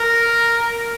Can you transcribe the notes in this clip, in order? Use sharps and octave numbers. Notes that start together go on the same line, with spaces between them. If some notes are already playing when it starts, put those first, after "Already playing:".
Already playing: A#4